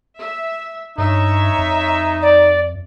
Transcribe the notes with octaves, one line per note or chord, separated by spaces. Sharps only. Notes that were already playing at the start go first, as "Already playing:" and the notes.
E5
G2 D#4 C#5 E5
F2
D5